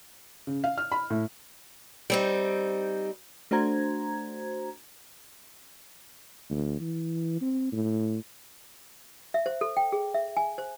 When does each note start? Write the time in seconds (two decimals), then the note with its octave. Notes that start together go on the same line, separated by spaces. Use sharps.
0.47 C#3
0.64 F5
0.78 F6
0.92 B5
1.10 A2
2.10 G3 C4 D#4
3.51 A3 D4 F#4 C5 A#5 G#6
6.50 D2
6.81 E3
7.42 C4
7.72 A2
9.34 E5
9.46 C5
9.61 A4
9.77 G5
9.92 G#4
10.14 E5
10.37 G#5
10.58 C5